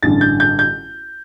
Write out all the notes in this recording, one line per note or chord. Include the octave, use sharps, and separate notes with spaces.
A1 G2 D3 A6
G6
G6
G6